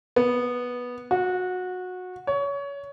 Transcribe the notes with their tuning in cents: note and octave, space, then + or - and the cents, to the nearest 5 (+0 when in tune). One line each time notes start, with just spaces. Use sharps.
B3 -10
F#4 -20
C#5 +25